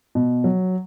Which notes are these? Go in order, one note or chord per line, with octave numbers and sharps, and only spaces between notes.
B2
F#3